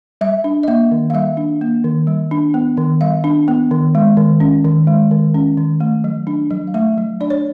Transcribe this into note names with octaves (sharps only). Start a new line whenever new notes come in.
G3 E5
D4
D#5
A#3 E5
D#3
F5
G3 E5
D4
A#3
D#3
G3
D4
B3
D#3
G3 F5
D4
B3
D#3
G#3
D#3
C#4
D#3
G#3
D#3
C#4
D#3
A3
F#3
D4
F#3
F5
A3 E5
F#3
D4 D5
C#5